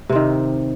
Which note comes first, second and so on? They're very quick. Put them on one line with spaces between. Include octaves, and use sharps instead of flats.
C3 C4 D#3